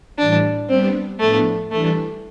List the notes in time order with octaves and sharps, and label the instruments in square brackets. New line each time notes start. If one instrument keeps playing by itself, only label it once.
[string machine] A2 E3 G3 [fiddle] D4
[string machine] G3 B3 D4 [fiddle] C4
[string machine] A2 F3 B3 D4 [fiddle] A3
[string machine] E3 G3 D4 [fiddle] A3